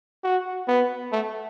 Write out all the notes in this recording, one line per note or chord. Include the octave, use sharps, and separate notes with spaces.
F#4
B3
A3